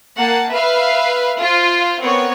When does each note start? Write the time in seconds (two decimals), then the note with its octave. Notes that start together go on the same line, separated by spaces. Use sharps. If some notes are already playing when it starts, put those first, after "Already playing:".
0.17 A#3 F#5 A5
0.52 B4 E5 F5
1.40 F4 C5
2.01 B3 C4 A#4 C#5